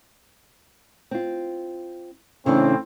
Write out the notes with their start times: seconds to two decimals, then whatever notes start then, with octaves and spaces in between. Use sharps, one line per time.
1.11 C4 F4
2.46 A2 C#3 E3 C4 D4